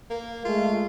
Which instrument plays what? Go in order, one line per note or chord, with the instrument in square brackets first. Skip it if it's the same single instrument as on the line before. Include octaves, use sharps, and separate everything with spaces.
[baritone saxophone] A#3
[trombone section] G#3 A3 [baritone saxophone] F4